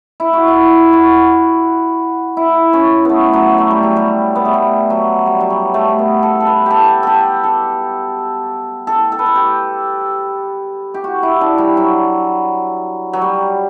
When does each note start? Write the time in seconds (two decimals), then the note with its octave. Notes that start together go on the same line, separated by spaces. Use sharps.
0.20 E4
0.33 F#4
0.48 E4
0.93 F#4
2.37 E4
2.73 C#4
3.05 A3 B3
3.33 F#3
3.58 A3
3.71 G3
3.83 F#3
3.97 G3
4.35 B3
4.45 A3
4.54 G3
4.90 F#3
5.26 G3
5.40 F#3
5.50 G3
5.74 A3
5.99 B3
6.23 A4
6.40 A4
6.47 B4
6.66 G4 A4
7.03 G4 A4
7.43 A4
8.87 A4
9.12 A4
9.19 B4
9.26 A4
9.36 G4
10.94 G4
11.04 F#4
11.23 E4
11.41 D4
11.58 G3
11.77 F#3
13.13 F#3
13.22 G3